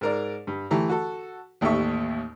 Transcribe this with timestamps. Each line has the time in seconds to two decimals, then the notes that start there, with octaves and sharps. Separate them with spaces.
0.01 G#2 A#4 D5
0.47 G2
0.71 E3 A3 G4 A#5
0.89 F#4 A4
1.61 A1 D#2 G4 A4 E5 C#6